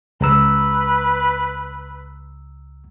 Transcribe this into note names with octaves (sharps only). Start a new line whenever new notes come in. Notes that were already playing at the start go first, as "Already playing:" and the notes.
C#2 B4 A#5 E6